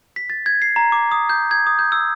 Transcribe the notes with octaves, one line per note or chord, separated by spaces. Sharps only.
B6
A6
G#6
C7
A#5
D6
D#6
G6
G#6
D#6
G6
E6